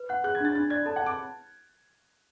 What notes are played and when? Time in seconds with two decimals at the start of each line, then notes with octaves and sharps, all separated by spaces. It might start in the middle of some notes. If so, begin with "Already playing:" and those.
Already playing: B4
0.09 F#5 F#6
0.24 G#4 F#6
0.35 G#6
0.41 D4 A6
0.55 D4 A6
0.70 D5 G#6
0.86 A4 A5
0.96 F#5
1.01 A5
1.06 D6